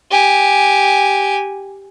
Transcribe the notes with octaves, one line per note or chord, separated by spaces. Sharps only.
G4 G#5